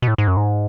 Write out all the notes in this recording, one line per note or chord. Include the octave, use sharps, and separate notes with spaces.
B2
A2
G#2
F#2
G#2